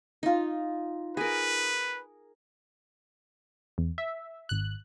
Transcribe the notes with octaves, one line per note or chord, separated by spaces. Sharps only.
D#4 F4
G#4 A#4 B4
E2
E5
G#1 F#6